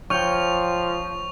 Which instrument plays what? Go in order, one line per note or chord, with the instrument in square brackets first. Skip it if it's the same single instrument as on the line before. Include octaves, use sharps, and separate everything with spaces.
[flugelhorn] F3 [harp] C#5 G5 F6 [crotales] C#6 F7